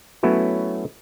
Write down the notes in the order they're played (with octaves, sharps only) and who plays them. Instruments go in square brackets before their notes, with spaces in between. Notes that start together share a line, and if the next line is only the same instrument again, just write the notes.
[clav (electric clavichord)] F#3 A3 B3 C#4 E4 F#4